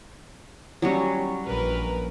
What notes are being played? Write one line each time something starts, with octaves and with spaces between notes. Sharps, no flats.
F#3 G3 C#4
A#1 A#4 B4